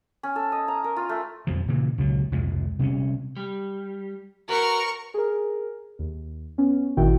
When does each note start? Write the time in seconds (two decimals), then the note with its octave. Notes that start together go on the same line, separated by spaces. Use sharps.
0.23 C#4
0.36 A4
0.52 D#5
0.68 A#5
0.84 A#4
0.97 F4
1.09 A3
1.47 B1 F2 B2 F3
1.68 A#2 C#3 E3
1.98 C#2 B2 F#3
2.32 C2 F2 A#2 G#3
2.79 C3 G3 A3 C#4
3.37 G3
4.49 F#4 A#4 B4 C#6
5.14 G#4 A#4
5.99 D#2
6.58 B3 C#4
6.97 G#1 A#2 D#3 E4 F#4 G5